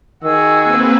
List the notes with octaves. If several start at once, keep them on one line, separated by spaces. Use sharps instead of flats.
D#3 F#4 G#4 E6
A#3 C4 B4